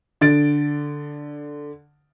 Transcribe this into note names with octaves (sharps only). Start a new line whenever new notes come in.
D3 A6 D7